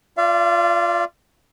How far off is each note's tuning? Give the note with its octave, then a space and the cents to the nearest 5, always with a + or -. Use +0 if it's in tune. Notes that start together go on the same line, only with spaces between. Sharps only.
F4 +0 D5 -10 F5 -40